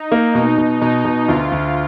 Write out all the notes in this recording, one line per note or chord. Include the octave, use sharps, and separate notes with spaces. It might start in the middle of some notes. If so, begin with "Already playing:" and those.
Already playing: D#4
A#3
B2 D#4
B2
B2 D#4
B2
D2 F4
D2